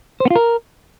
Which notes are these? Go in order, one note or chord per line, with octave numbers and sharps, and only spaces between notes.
C5
B3
F4
A#4